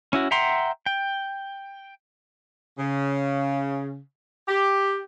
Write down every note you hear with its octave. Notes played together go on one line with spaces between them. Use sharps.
C#4 E4 F#4
E5 F#5 G5 A#5 C6
G5
C#3
G4